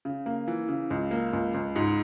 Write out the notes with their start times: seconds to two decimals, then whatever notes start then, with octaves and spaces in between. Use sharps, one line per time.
0.05 C#3
0.26 A#3
0.48 E3
0.69 C#3
0.90 C#2
1.11 A#3
1.33 C#2
1.54 C#2
1.76 G#2